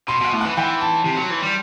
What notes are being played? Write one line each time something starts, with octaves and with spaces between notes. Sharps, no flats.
B2 C6
B2 F#5
A2
E3 F#5
E3 G5
A5
C3
F#3
E3
G3